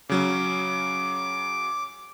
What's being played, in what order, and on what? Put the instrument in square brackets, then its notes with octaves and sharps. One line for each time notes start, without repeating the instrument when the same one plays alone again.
[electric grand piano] C#3 F#3 C#4 [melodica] D6